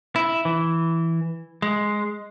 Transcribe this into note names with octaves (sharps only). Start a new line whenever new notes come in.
E4
E3
G#3